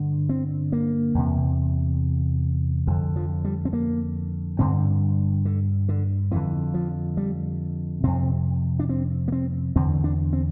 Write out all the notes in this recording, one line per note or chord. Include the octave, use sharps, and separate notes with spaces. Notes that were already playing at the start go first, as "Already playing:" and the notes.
Already playing: G2 D3
C4
A#3
E2 C3
F2 D3 E3
F3
G3
C4
A#3
G2 D3 C4
D3
D3
F2 D3 E3
F3
G3
F2 C3 C4
D4
C4
A#3
C4
E2 D3 C4
D4
C4